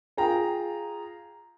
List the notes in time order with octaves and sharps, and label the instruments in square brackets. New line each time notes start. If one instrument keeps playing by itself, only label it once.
[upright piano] F4 G#4 G5 A#5